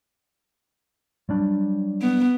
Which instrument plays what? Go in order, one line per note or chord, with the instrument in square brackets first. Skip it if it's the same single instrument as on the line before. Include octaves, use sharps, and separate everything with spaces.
[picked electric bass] F#3 G3 D4
[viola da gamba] B3